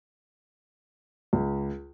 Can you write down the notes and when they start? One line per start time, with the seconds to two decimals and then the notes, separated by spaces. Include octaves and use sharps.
1.33 C#2